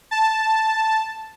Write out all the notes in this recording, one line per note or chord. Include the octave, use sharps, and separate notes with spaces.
A5